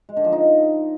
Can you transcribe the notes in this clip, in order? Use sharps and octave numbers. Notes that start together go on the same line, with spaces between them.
G#3
D3
F3
D#4